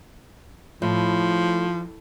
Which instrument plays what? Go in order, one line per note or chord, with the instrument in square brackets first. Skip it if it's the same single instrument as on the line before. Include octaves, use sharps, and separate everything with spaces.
[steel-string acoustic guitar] A2 [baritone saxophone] F3